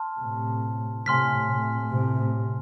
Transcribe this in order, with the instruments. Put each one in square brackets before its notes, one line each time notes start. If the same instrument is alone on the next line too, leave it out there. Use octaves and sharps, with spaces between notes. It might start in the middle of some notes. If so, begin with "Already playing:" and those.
Already playing: [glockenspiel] A5 C6 F6
[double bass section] A2 C3
[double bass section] A2 C3 [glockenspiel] G#5 C6 F6 B6
[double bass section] A2 C3
A2 C3